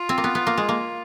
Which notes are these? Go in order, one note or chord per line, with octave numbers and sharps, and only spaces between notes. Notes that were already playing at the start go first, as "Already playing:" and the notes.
Already playing: F4
C4
A#3
B3
B3
A#3
G#3
A#3